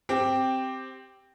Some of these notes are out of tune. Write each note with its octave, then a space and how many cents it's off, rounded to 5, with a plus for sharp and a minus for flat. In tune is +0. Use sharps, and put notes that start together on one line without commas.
C4 +0 G4 +0